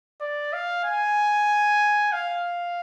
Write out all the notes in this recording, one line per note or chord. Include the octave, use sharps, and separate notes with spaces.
D5
F5
G#5
F5